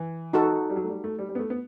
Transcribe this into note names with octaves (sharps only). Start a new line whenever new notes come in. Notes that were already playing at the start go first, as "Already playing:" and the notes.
Already playing: E3
D#4 F#4 A4
G3
F#3
A3
G3
A3
G3
G3
B3
A3
B3